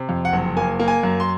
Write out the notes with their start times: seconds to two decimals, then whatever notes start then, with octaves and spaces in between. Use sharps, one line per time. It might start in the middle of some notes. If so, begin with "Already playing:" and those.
Already playing: C3
0.09 F2
0.25 F#5
0.33 F#1
0.56 A#3 G#5
0.79 A#3
0.88 G#5
1.03 F#2
1.20 C6